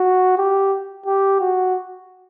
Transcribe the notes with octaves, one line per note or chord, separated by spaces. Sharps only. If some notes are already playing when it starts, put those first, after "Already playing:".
Already playing: F#4
G4
G4
F#4